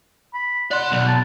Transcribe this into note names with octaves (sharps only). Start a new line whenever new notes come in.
B5
D5 F#5 C6
B1
A5